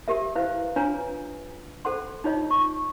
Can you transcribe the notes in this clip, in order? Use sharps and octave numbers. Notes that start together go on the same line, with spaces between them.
G4 A#4 E5
E4 B4 C5 F5
D4 F4 B4 C#5 G#5 A#5
A4 C5 F#5 C6
D#4 F4 C#5 D#5
C#6